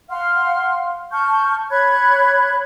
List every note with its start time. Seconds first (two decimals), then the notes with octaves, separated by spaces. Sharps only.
0.09 F5 F#5 C6 F6
1.12 A5 C#6 F6 G6
1.70 C#5 B5 F#6 G#6